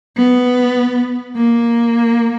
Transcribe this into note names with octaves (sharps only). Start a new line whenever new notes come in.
B3
A#3